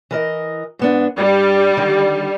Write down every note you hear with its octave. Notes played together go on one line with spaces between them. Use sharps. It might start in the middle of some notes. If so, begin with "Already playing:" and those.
E3 A#4 D#5
G#2 B3 D4
G2 G3
D3 D#3 D5